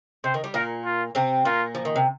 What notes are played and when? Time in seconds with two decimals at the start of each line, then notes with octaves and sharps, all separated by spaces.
0.24 C3 C5
0.34 D#3
0.44 G3
0.54 A#2 A#3 A#4
0.85 F4
1.15 C3 C4
1.45 A#2 A#3 F4
1.75 F3
1.85 D#3
1.96 C3